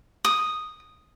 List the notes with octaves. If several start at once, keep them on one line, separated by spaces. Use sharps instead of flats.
D#6